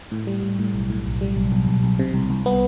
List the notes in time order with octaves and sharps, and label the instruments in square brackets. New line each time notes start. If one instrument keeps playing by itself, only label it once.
[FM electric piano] A2
G3
A2
A2
B1
A2
B1
G3
B1
B1
B1
B1
C3
C2
C2
B3